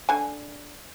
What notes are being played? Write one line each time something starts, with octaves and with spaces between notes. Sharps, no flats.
D3 G#5